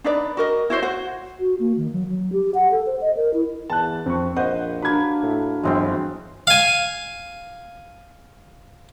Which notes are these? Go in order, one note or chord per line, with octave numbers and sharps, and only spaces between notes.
D4 D#4 B4 D5
F#4 A#4 D#5
E4 F#4 C5 C#5
F#4 C5
F#4
A#3
D#3
F#3
F#3
G4
F#5
A4
C5
D#5
A#4
E4
E2 A5 F#6
F2 C4 C#6
A#1 B4 C5 D#5 F#5
F#3 A#3 D4 B5 G#6
A2
G1 E3 F#3 G#3 C4 F5
F5 G#5